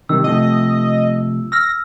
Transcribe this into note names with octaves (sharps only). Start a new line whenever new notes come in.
C3 D#3 G3 E6
C3 F3 A3 D#5
E6 F6 A#6